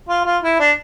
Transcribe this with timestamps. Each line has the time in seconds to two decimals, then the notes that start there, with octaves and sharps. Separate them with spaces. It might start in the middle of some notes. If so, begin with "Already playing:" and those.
0.09 F4
0.25 F4
0.43 E4
0.60 D4